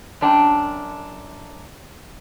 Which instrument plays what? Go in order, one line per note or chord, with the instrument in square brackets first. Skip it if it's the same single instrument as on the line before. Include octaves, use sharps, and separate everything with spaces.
[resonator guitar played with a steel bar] F#2 D4 G5